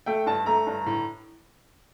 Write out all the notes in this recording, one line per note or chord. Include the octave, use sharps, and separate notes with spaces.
A3 G5
G2 A5
A3 A#5
G2
A2